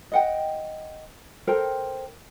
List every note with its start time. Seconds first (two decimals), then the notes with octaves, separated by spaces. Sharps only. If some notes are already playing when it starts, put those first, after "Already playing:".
0.12 D#5 F#5 G5
1.47 A4 A#4 C5 G5